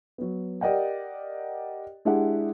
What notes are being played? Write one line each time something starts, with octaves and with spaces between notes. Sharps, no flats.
F#3 B3
G4 A#4 D5 D#5 F#5 G5
G#3 D4 E4 G4 G#4 F#5